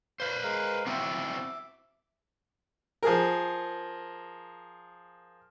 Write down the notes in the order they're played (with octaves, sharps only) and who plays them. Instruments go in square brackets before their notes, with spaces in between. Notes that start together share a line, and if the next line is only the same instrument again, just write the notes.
[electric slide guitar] B4 C5 [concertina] F5
[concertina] G#3 A#4 F5
[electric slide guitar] C4 E4 F#4 [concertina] E5 D6
[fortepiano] F3 G#4 A#4